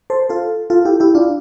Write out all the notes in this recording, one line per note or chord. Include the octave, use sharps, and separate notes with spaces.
A4 C5
F4 A4
F4 A4
E4 G4
E4 G4
D4 F4